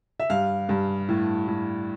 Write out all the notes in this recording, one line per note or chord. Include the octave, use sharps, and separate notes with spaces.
E5
G2 F5
G2
A2
A2